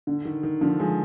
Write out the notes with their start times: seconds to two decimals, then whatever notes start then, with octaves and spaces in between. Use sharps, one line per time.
0.07 D3
0.25 D#3
0.43 D#3
0.61 D3 F3
0.79 F3 G#3